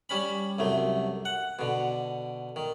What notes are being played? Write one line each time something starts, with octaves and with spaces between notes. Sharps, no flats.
G3 C#4 B5
C2 F#2 A3
F#5
B2 D3
D#3